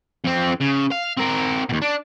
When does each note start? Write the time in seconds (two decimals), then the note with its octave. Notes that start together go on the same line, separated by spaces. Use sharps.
0.24 F2 C4
0.61 C#3
0.92 F5
1.17 C4 A#4
1.69 D#2 B2
1.82 D4